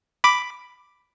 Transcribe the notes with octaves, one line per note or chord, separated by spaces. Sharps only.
B5 D6